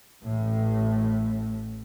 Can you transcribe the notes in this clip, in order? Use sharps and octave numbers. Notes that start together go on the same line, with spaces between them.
A1 A2